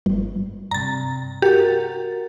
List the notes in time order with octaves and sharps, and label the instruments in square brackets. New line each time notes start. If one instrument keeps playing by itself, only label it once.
[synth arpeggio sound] G1
[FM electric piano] G2 C3 [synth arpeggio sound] A#5 A6
[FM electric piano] F#4 A#4 A6 [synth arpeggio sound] G4